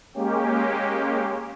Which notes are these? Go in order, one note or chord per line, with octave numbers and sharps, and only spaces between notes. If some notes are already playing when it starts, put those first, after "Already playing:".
G#3 A#3 C#4 G4